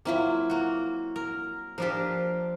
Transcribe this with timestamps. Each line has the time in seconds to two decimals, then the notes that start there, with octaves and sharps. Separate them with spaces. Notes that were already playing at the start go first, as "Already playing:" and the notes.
0.05 F#3 A#3 C4 E4 F4
0.50 A#3 F#4
1.16 A#4
1.78 F3 D4 F4 G4 A#4